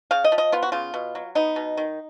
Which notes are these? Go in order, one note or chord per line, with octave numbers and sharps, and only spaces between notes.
C#3 F5
D#5
F3
D#5
B3 F4
F#4
C#3 F4
B2
F#3
B3 D#4
B2
D#3